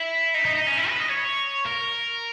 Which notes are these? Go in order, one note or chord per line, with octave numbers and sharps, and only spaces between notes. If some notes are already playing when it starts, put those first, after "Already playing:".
Already playing: E4
D#4
D#4
D#4
C#4
E4
B4
D#5
C#5
A#4